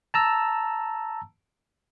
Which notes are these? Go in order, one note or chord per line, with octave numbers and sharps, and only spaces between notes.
A5 A#5 E6